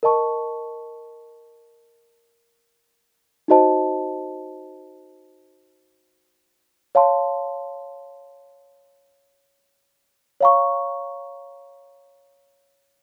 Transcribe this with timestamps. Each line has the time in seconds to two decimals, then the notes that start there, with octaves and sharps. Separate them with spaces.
0.03 A#4 D#5 A5 C#6
3.48 D#4 F#4 C5 D#5 A5
6.95 C#5 F5 A5 C6
10.41 C#5 F5 A#5 C#6